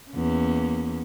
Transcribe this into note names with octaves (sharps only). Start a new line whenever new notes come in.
E2 A#3 C#4